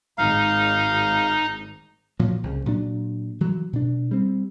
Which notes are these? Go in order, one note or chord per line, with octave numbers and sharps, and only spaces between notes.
G#1 D#4 F5
A#2 F3 F#3
C2 C#3
A#2 F#3 D4
E3 F#3
B2 D4
G3 C4